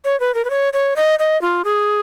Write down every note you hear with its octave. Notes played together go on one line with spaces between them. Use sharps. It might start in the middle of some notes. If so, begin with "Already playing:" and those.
C#5
B4
A#4
B4
C#5
C#5
D#5
D#5
F4
G#4